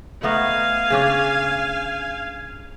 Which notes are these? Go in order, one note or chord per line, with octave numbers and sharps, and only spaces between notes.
A3 B3 D#4 F5 G#5
C#3 C#4 D4